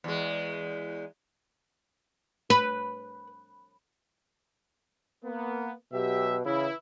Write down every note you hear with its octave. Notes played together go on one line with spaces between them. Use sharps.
E2 G#3
B4
A#3 B3
B2 F#3 G4 E5
C#3 E3 E4